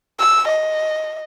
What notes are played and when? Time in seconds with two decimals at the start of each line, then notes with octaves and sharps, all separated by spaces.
0.19 E6
0.48 D#5